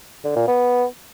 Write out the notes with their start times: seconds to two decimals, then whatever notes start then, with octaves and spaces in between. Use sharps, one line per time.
0.24 D3
0.36 A#2
0.48 B3